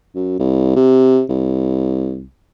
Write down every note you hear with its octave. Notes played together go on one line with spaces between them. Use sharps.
F#2
C2
C3
C2